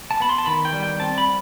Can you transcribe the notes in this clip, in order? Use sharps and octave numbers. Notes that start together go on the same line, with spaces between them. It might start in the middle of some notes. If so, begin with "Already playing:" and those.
A5
B3 B5
C6
A5
D#3 B5
G5
G3
G5
C4 A5
B5